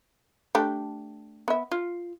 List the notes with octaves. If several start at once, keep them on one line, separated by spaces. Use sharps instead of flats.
A3 D4 G4
B3 E5
F4